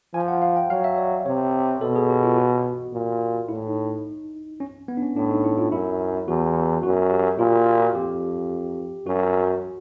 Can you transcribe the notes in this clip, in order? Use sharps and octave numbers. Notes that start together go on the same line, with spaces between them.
F3 G#5
F#5
F5
G5
F#3 F5
E5
D5
C3 C#5
B2 A4
G#4
G4
F4
F#4
A#2
A2 E4
D#4
C#4
B3
D4
C#4
A2 D4
D#4
E4
F4
F#2 E4
E2 F#4
F#2 F#4
G4
A#2 F4
F4
F#4
F2 G4
F#2 F#4